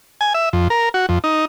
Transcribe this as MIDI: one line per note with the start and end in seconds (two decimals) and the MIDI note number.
0.21 0.33 80
0.34 0.49 76
0.53 0.68 41
0.70 0.89 70
0.94 1.06 66
1.09 1.19 41
1.24 1.45 63